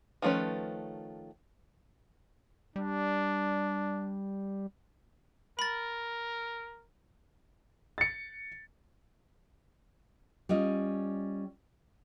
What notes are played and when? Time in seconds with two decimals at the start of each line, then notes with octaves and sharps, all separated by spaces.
0.22 D#3 F3 A3 C#4 B4
2.76 G3 D4
5.59 A#4 B5 A6
7.98 A6 C#7
10.49 G3 C#4 F4 D#5